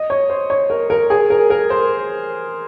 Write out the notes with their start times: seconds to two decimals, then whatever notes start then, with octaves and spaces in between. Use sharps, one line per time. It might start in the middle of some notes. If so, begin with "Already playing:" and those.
Already playing: D#5
0.10 C#5
0.30 C5
0.50 C#5
0.70 A#4
0.90 A#4
1.10 G#4
1.30 A#4
1.50 A#4
1.70 C5